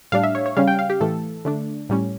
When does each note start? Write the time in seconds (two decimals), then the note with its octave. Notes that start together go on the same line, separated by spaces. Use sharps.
0.12 A2 G3 D4 F5
0.24 E5
0.35 C#5
0.46 C#5
0.57 C#3 G3 C#4 F5
0.68 G5
0.79 F5
0.90 G4
1.01 A2 E3 A3 A4
1.45 D3 A3 D4
1.89 A2 G3 C#4